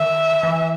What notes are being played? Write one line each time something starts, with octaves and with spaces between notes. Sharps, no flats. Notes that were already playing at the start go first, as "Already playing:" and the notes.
Already playing: D#3 E5
E3